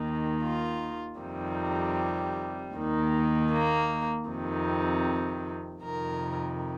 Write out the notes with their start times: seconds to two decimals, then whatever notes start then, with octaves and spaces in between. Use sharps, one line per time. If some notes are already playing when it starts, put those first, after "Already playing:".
Already playing: D#2 D#3
0.43 F4
1.20 F2 C3 D#3 G3
2.75 D#2 D#3
3.52 A#3
4.28 F2 C3 D#3
5.82 F2 C3 D#3 A#4